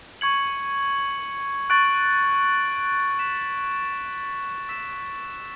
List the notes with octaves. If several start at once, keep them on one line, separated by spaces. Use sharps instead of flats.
C#6 G#6 C#7 F#7
C#6 F#6 A6 D7 F#7
F#6 B6 E7
E6 B6 E7